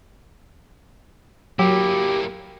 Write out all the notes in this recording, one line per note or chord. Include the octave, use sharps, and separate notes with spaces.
F#3 A#3 E4 G4